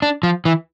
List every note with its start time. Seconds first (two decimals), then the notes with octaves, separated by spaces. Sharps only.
0.02 D4
0.23 F3
0.45 E3